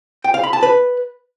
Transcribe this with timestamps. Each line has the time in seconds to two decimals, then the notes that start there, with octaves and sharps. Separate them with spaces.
0.24 G5
0.34 F5
0.44 B5
0.53 A5
0.63 B4